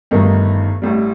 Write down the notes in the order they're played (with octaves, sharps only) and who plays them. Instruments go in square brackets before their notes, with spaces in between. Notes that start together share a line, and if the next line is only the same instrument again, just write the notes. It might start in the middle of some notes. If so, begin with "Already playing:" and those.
[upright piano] G1 G2 D#3 A3 D#4
A1 A2 G3